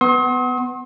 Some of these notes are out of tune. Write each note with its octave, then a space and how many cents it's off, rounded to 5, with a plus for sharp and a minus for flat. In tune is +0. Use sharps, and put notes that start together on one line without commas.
B3 +15 C6 +35 D#6 +45